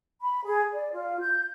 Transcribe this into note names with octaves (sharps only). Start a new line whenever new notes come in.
B5
G#4
D5
F4
G6